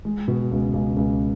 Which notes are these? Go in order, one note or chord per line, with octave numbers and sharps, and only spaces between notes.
G#3
B2
C#2
C#2
C#2